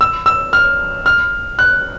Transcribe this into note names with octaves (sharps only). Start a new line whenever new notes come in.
E6
E6
F6
F6
F#6